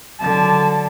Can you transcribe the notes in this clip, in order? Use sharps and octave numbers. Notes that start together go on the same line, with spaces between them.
D3 F#3 A5